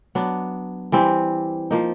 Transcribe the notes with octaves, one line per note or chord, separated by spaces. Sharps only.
F#3 B3 D4
E3 G3 C4
F3 A#3 D#4